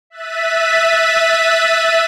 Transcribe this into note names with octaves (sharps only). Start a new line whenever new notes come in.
E5 F#6 A6 B6 D#7